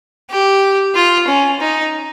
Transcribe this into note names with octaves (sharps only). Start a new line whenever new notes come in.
G4
F4
C#4
D#4